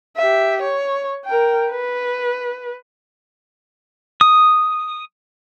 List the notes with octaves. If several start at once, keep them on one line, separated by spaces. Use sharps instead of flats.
G4 E5
C#5
A#4 G5
B4
D#6